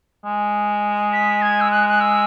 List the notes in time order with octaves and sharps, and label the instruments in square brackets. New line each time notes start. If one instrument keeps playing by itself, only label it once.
[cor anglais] G#3
[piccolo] B6
G#6
E6
F#6
F#6
E6